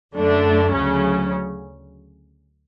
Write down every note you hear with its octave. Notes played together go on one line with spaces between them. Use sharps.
F#2 D3 A3 D4
D2 C#3 F#3 C#4